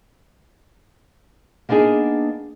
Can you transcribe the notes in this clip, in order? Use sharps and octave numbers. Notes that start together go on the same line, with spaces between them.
A#3 B3 D4 D#4 G#4